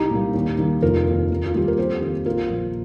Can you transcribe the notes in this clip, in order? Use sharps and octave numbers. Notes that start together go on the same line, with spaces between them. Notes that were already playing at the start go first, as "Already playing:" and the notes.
Already playing: C2 D#4 G4
A#2 G3 A#3
D#2
D#3 G3 A#3
F1 F4 A#4
D#2 D#3
D#2
F4
D#3 G3 A#3 G4
A#4
F2 G4 C5
D#3 A#3
A#1 F4 A#4
A#2 F3